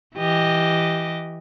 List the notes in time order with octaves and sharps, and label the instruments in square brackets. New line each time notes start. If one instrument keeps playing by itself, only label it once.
[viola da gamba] E3 G4 D#5